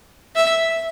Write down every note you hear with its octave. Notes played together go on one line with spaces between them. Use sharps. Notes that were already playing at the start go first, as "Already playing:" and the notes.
E5